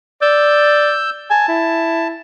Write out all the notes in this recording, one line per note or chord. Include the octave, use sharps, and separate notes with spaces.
D5 E6 G6
G#5 A5
E4